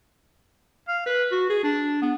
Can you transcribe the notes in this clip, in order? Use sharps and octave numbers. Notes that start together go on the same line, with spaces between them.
F5
B4
F#4
G#4
D4
B3